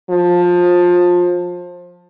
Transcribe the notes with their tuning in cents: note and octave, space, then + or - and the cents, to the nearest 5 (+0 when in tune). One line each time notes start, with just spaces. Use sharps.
F3 +20